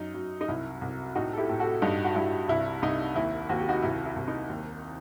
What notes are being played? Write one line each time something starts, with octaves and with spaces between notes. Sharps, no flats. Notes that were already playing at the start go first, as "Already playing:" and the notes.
Already playing: F#2 D#4
F#2
D#4
C2 E4
C2
A2 D#4 F#4
A4
E4 G4
A2
F#4 A4
G2 D#4 F#4
F#4
G2 E4
C2 E4
C2 D#4
D#2 E4
D#2 F#4
G4
D#4 F#4
C2 E4
E4
C2
D#4
D#2